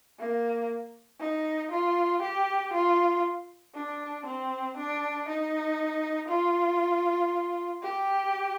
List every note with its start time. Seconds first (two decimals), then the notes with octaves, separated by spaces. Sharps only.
0.19 A#3
1.20 D#4
1.71 F4
2.22 G4
2.73 F4
3.75 D4
4.26 C4
4.77 D4
5.28 D#4
6.29 F4
7.83 G4